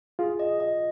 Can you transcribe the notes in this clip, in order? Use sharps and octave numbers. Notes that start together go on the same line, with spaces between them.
F4 G#4
D#5
D#5